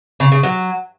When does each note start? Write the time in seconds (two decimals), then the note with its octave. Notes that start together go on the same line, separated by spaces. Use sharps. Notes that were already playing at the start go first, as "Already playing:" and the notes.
0.20 C#3
0.32 C#3
0.43 F#3